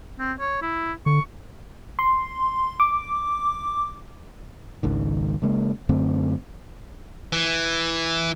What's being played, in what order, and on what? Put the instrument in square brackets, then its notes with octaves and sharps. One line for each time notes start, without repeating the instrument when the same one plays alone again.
[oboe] C4
C#5
E4
[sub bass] D3 [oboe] C#6
[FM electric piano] C6
D6
[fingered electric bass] G#1 C#2 D#3
C#3 G#3 A#3
F#2 D3 A3 C4
[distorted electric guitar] E3